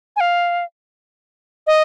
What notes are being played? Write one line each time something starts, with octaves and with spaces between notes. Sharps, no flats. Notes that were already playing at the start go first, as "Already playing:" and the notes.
G#5
F5
D#5